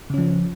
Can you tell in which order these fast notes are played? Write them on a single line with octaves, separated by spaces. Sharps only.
C#3 C#4 F3